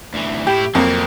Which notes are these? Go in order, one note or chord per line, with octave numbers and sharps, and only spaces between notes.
D2 E3
A2 E4 G4
F2 F#3 A#3 C4